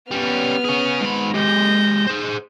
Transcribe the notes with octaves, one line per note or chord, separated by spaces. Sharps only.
G3 B3 C#4 F6
C#4 G#4
G#2 B5
G#3 G4 G6 A#6
G#4 C5